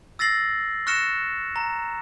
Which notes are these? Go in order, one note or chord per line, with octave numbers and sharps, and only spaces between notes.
E6 A6 A#6 C7 F#7
C#6 F6 F#6 A#6 C#7 E7
A#5